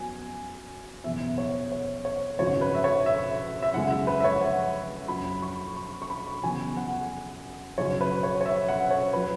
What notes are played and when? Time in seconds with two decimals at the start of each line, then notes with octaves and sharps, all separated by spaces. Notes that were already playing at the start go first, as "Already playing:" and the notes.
Already playing: F#2 F#3 B3 G#5
1.04 F#1 E2 B2 E5
1.38 C#5
1.72 C#5
2.05 C#5
2.39 G#1 F#2 C#3 F#3 C#5
2.61 B4
2.75 E5
2.84 C#5
3.06 E5
3.63 E5
3.73 F#2 C#3 G#3 F#5
3.90 E5
4.07 B4
4.20 E5
4.24 C#5
4.41 F#5
5.08 F#1 F#2 F#3 B5
5.42 C#6
5.76 C#6
6.02 C#6
6.10 B5
6.43 E2 C#3 F#3 B3 G#5
6.77 F#5
7.78 F#2 C#3 F#3 C#5
8.01 B4
8.23 C#5
8.41 C#5
8.46 E5
8.68 F#5
8.91 C#5
9.13 F#3 B4